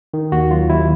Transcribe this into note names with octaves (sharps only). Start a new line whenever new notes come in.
D#3
D#2 F#4
F#3 F4
D#2 E4